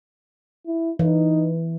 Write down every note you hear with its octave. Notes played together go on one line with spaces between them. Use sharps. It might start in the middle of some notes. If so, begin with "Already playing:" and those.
E4
E3 D#4